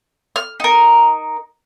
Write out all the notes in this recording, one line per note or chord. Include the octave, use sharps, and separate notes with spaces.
F6
D#4 A#4